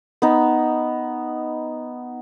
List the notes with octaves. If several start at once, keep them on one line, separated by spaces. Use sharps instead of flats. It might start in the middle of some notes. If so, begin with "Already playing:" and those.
B3 D#4